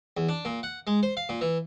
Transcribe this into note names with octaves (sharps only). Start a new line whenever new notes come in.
E2
D4
A#2
F#5
G#3
C5
F5
A#2
E3